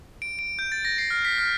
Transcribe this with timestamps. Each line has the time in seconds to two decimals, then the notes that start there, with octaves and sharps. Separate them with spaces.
0.22 D7
0.39 D7
0.59 G6
0.72 A6
0.85 A#6
0.98 C7
1.10 F6
1.25 B6
1.38 F6